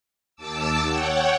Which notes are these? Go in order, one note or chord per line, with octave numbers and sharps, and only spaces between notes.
D#2 A5 D6 E6
C#5 F#5 G5